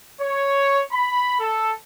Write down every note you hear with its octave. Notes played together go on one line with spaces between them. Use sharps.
C#5
B5
A4